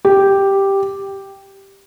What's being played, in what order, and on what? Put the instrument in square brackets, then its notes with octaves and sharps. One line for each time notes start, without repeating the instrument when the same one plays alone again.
[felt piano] G4